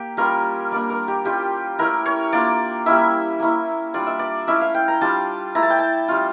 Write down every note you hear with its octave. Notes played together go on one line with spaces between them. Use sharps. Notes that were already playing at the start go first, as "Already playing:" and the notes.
Already playing: A#3 G4
G3 C#4 F4 A#4
G3 A#3 D4 D5
A#4
G4
G3 C#4 F4 G4
A3 C#4 E4 A#4
C#5
A#3 D4 F4 D5
G3 A#3 C#4 E4 E5
A#3 C#4 E4
G3 D4 F4 D5
E5
D5
A3 C#4 E4 E5
F5
G5
A#5
G3 D4 F4 A5
A3 E4 A#5
A5
G5
A5
G3 C#4 F4